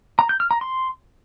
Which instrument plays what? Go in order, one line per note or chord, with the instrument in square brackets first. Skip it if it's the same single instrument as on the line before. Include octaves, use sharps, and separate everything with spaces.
[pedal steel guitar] A#5
G6
F6
A#5
C6